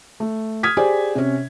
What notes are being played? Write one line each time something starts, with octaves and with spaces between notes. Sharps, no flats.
A3
D#6 F6 G#6 B6
G4 G#4 C5 D5 G#5
C3 C#4